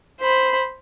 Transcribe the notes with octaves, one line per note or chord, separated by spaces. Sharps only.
C5 B5